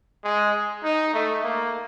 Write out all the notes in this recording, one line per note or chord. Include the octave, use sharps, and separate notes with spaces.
G#3
D#4
A3
A#3